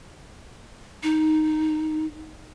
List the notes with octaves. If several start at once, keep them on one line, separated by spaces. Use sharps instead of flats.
D#4